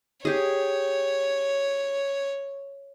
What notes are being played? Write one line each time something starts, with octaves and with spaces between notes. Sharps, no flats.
G4 G#4 C#5